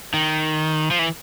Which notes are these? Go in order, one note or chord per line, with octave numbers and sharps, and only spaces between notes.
D#3
F3
E3